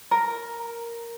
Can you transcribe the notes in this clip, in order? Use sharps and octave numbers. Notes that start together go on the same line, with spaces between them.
A#4